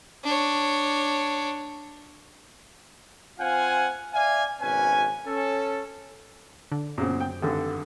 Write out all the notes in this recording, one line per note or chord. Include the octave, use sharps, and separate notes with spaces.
D4 C#5
C4 F4 F5 F#5 G#5
D5 E5 F5 G#5
G#1 B2 C#4 B4 G#5
C#4 A4
D3
F#2 A#2 C#3 B3 C4
G5
G#1 G2 D3 A4